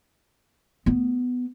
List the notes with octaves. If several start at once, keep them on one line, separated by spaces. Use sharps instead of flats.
B3